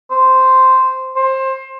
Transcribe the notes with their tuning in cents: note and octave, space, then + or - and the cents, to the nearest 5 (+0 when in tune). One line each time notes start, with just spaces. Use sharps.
C5 -5
C5 +25